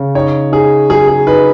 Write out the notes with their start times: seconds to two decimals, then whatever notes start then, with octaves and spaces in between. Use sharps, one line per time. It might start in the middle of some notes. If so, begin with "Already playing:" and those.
Already playing: C#3
0.15 D#4 C#5
0.52 D#4 G#4
0.89 F#3 G#4
1.08 G#4
1.27 D#4 B4